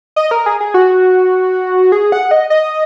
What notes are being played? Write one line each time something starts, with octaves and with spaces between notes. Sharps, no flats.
D#5
A#4
G#4
G#4
F#4
G#4
F#5
D#5
D#5